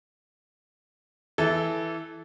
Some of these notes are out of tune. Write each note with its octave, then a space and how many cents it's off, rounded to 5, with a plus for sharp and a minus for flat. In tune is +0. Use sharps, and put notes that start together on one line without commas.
E3 +0 A4 -15